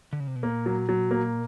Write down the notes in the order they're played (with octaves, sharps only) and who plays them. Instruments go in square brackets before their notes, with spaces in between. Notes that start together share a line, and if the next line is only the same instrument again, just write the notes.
[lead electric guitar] D3
C#3
C3
B2
[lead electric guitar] A#2 [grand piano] A#3
[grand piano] F#3
F#3
A#3